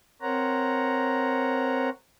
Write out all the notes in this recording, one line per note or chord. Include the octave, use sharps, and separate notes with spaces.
C4 A#4 C5 C#5 F#5 A#5